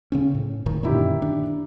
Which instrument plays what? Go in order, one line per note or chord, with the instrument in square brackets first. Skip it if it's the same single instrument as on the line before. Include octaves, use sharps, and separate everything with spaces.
[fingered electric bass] C#3 C4 C#4
A2
F#1 A2 D#3
[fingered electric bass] F#2 A#2 D3 [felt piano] D#3 E4 G4
[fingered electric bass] D4